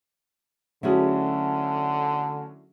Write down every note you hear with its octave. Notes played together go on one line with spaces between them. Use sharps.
D3 F#3 A3 C#4 E4 F#4 G#4